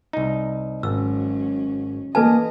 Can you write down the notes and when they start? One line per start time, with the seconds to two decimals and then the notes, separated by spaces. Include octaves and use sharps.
0.13 C2 D#4
0.83 G#1 G#2 F#3 C#4 E6
2.15 E3 A#3 A4 B4 D#5 G#5 A5